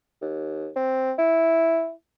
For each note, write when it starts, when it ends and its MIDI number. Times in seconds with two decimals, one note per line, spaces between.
0.21 0.68 39
0.76 1.13 60
1.18 1.91 64